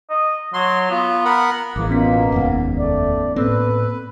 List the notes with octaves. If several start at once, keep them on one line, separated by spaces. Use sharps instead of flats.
D#5
F#3 C6
B3 F4
A#4 F#5 B5
A1 E3 G#3 A#3 D6
B2 A#3 B3 C#4 F4 B6
F1 D#2 G#2 F#5
A3 D5
A2 A#3 C4 A4 B4